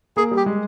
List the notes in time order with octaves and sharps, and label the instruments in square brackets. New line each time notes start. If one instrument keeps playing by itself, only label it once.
[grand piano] A#3 [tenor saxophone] G#4
[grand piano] G3
[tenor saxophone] G4
[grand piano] G#3